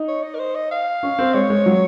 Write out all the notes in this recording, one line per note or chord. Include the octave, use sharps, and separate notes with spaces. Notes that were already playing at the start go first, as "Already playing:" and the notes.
Already playing: D#4
C#5
D#5
A#4
C5
D#5
F5
C#4
C4
G#3 C#5
G#3
F#3